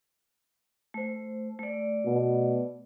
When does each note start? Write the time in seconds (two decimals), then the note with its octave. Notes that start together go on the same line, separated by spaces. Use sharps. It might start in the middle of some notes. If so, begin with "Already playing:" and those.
0.94 A3 C5
1.59 A3 D5
2.05 B2